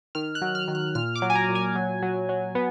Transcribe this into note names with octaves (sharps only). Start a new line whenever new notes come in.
D#3 F6
F#6
F#3
F6
D#3
F#6
A#2 F6
D6
F#3
G#5
A#5
A#2
G#5
F#3
F#3
F#3
B3